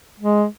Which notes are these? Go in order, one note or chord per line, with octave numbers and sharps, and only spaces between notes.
G#3